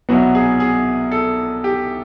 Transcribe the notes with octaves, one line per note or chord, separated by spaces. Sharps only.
C2 B2 F#3 B3 F#4
G#4
G#4
A4
G4